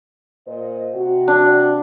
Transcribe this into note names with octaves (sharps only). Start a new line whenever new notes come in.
A#2 C5 D#5
C3 F#4
D4